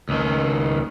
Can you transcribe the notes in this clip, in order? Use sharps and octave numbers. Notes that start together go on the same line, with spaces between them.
C#2 D#3